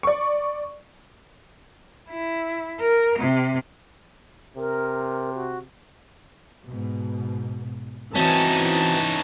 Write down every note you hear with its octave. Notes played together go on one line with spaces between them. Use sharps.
D5 C#6
E4
A#4
C3
C3 A#4
F#4
G#2 B2
E3 C4 C#4 D#4 F#4 A5
A5